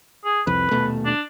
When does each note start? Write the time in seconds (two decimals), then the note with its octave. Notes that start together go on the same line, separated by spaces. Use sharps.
0.25 G#4
0.47 C2 F2 B4
0.71 D#1 B2 A3
1.06 D4